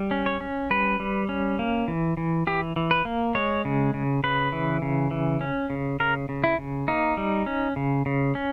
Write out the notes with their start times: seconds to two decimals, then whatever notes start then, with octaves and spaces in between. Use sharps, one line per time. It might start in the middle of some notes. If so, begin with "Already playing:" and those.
Already playing: G3
0.11 C#4
0.26 C#5
0.41 C#4
0.70 G3 B4
1.00 G3
1.29 C#4
1.59 A#3
1.88 E3
2.17 E3
2.47 E3 G4
2.76 E3
2.91 B4
3.05 A#3
3.35 G#3 C#5
3.65 C#3
3.94 C#3
4.24 C#3 B4
4.52 E3
4.82 C#3
5.11 E3
5.41 C#4
5.70 C#3
6.00 C#3 A#4
6.29 C#3
6.44 E4
6.58 C#3
6.88 A#3 D#4
7.17 G3
7.46 C#4
7.76 C#3
8.06 C#3
8.35 C#4